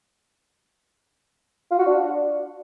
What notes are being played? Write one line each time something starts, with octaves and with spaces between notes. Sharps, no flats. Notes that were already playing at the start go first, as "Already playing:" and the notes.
F4
F#4
D4